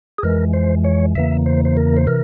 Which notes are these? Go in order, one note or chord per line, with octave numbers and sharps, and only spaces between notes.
G#4
F2 E3 G#3 A#4
C5
C#5
E2 C#3 E3 A#3 E5
C5
C5
A#4
C5
C3 E3 A#4